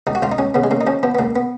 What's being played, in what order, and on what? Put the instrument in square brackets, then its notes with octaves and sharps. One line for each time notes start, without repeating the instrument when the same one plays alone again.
[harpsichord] C#2 D#4
F#4
C#2 F4
D#4
C#2 C#4
C#3 B3
G#3
C#3 A#3
D#4
F3 C#4
F3 B3
B3
C#2 A#3
B3